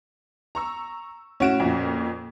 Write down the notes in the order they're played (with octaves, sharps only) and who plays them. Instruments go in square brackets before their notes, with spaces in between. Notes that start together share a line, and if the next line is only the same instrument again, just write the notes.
[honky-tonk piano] A#5 C#6 E6
[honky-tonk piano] A2 D7 E7 [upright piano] C#4 F#4
[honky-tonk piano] F2 A#2